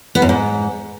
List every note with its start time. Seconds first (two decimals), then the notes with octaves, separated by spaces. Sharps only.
0.15 B3
0.22 F#2
0.29 G#2